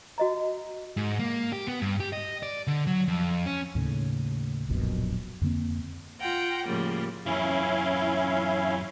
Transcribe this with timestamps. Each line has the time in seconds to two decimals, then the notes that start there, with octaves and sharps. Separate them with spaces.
0.18 F#4 D#5 A#5
0.97 G#2
1.20 A#3
1.53 G4
1.67 B3
1.82 G2
2.00 G4
2.13 D#5
2.43 D5
2.67 D3
2.87 F#3
3.08 F2
3.46 C#4
3.75 D#2 A2 C#3
4.69 D1 A#1 F#2 B2
5.41 F2 D3 A#3 C4
6.21 F4 F#5 G5 A#5
6.67 A2 C#3 F3 G3 A#3
7.26 F#2 E3 C#4 E4 F5